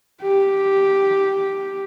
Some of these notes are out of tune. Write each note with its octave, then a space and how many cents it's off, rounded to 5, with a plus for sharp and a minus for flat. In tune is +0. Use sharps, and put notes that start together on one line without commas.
G4 -5